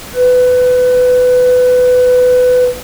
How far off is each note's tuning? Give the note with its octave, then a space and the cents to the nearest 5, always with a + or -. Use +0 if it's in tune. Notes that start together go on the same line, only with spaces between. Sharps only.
B4 +20